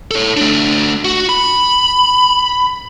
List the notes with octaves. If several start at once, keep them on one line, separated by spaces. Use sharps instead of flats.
A4 C#5
A3 D4
F#4
B5